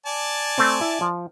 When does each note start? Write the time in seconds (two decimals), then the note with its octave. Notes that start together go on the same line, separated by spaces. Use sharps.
0.06 D5 G#5 A5
0.58 A3 C4
0.81 E4
1.01 F3